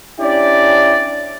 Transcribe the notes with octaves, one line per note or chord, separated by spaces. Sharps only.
C#4 D4 E4 G4 D5